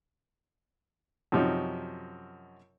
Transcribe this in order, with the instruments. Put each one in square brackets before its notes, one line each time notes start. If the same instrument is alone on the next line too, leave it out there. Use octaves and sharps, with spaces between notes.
[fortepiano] F#2 C3 F3 C#4 D#4